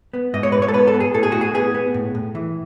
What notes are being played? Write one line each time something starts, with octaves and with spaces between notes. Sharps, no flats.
B3
G#2 D#5
C#5
G#2 B4
C#5
A4
B3 B4
A4
B3
G#4
A2 A4
G#4
A2 F#4
G#4
B3 G#4
B3
A2
A2
E3